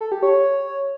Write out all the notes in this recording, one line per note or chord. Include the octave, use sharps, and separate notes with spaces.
A4
G4
C#5